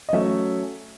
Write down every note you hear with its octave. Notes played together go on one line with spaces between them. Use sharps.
D#5
F#3 A3 C#4 E5